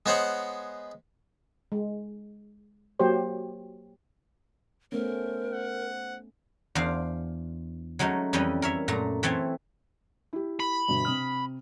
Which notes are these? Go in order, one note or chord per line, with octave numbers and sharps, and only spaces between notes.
G#3 B3 C5 C#5 F#5
G#3
F#3 A#3 F#4 G4 C5 C#5
A3 B3 C#4 A#4 C5
F#5
E2 D4 C5 F5
F#3 G#3 A3 C#4 D#4
F2 E3 G3 C#4 A4 D#5
A#4 C#5 E5
F#2 A#2 A3 A#5
E3 A3 C4 C#5 E5 A5
E4 G4
B5
G1 B2
C3 D#6 F6